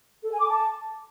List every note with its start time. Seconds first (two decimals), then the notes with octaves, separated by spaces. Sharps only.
0.23 A4
0.31 G#5
0.40 D6
0.49 A5